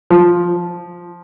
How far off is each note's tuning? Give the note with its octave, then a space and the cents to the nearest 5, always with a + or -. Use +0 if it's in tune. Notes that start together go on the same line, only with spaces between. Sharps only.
F3 +0